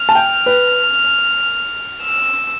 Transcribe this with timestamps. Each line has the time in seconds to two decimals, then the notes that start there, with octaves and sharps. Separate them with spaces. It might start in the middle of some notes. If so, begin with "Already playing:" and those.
Already playing: F6
0.09 A5
0.15 G5
0.46 B4
2.02 E6